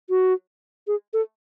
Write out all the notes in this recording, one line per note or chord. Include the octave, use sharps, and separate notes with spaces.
F#4
G#4
A4